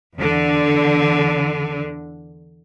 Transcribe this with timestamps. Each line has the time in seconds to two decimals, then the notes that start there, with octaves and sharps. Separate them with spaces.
0.14 E2 D3